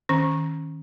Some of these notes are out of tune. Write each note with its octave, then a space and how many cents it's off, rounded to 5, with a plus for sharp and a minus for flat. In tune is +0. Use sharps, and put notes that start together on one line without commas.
D#3 +15 C#4 -15